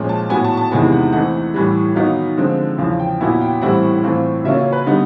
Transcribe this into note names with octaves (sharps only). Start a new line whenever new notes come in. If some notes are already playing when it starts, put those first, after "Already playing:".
Already playing: A#2 F3 G#3 C#4
A5
A2 F#3 B3 G#5
A5
A5
E2 C3 D#3 G#3 B3 G#5
F#5
E3 A3 C4 D#4 F#5
A2 E3 G3
D#3 F#3 B3 D#4 F5
D3 F3 G#3 C4
E2 C#3 F3 F5
G5
A#2 F#3 B3 E4 G#5
G5
A2 E3 G3 C4 E4 F#5
A2 E3 A3 C4 F4
C#3 F#3 A#3 C#4 F4 E5
C#5
B4
D3 G3 B3 D#4